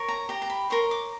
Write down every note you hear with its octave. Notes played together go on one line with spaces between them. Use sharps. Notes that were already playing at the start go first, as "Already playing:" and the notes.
Already playing: A#4 C#5
A#5
G4 A#5
A#5
B5
A#4 C#5 C6
D6